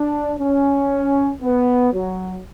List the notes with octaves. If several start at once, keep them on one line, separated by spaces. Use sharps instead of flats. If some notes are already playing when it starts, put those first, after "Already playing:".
Already playing: D4
C#4
B3
F#3